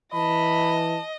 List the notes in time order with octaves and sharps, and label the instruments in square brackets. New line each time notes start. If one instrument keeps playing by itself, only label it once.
[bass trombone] E3 [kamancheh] D#5 [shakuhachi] A5 [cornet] B5